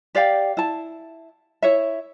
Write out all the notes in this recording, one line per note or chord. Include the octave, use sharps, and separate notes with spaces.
G4 D5 F5 G5
E4 A5
E4 C#5 E5